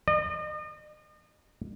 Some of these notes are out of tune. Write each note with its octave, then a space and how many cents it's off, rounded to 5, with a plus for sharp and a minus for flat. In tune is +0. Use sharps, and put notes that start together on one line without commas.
D#5 -40